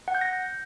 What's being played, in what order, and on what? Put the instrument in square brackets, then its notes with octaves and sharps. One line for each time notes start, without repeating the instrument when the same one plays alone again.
[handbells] F#5
G6
A#6